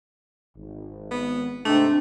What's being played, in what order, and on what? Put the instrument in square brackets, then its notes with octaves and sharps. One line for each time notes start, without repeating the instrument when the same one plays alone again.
[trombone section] G#1
[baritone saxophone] B3
[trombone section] G#2 C3 C4 [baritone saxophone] A3 [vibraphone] D4